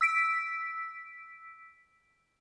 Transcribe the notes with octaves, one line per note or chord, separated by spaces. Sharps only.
E6 B6 D7